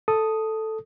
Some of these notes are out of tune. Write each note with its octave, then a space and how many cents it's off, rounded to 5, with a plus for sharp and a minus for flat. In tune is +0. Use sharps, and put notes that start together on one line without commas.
A4 +0 D#6 +0